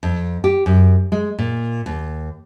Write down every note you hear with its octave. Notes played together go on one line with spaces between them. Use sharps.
F2
G4
F#2
G#3
A#2
D#2